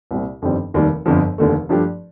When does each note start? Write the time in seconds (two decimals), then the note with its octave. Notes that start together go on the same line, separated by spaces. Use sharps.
0.11 C2 A#2 G3 C4
0.42 G1 F2 D#3 G3 C4
0.74 F1 D#2 D#3 G3
1.06 G1 F2 D3 F3
1.38 F1 D#2 D3 A3
1.69 G2 F3 A3 D4 G4